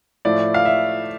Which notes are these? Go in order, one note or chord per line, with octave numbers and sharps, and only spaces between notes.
A2 F3 A3 D5
F5
E5